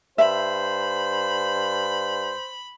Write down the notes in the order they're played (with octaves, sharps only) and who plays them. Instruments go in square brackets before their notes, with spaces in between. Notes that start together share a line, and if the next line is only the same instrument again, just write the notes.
[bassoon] G2 [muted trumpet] C5 [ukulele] E5 [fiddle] B5